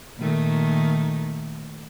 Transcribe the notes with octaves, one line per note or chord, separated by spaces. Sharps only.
A#2 D#3 A3